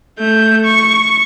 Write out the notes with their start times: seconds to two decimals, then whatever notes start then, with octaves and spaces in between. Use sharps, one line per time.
0.19 A3 G6
0.65 C#6